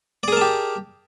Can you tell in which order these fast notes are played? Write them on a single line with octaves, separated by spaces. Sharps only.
D5 G#4 A#4 A5 G4